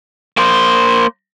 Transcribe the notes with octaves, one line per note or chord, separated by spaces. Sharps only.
A#3 C5